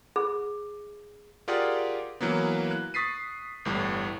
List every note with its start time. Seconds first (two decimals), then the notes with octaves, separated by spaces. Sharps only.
0.16 G#4
1.48 F4 G4 G#4 A#4 D5 F#5
2.21 E3 F#3 A#3 B3
2.71 F#6
2.94 C#6 D#6 A6 B6 C7 D#7
3.65 G1 E2 A2 G3